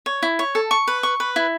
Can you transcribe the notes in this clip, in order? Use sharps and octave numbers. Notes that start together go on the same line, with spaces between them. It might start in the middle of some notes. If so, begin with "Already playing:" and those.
C#5
E4
C#5
A4
C#6
B4
C#6
B4
E4